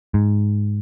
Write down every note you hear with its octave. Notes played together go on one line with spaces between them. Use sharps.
G#2